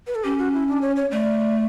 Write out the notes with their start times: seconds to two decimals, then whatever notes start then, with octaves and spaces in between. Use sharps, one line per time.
0.07 B4
0.15 A4
0.24 C#4 G4
0.39 F#4
0.54 E4
0.68 D4
0.82 C#5
0.96 C#5
1.11 A3 D5